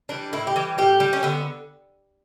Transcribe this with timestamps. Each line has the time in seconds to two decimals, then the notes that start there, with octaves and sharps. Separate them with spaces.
0.09 E3 G3 D4
0.33 A2 E4
0.47 G4
0.56 E3 G3
0.78 A2 G4
1.00 G3
1.13 C#4
1.23 D3 B3